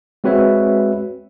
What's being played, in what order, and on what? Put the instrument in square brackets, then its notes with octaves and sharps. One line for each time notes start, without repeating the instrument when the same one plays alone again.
[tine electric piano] G#3 C4 F#4 B4 C#5 E5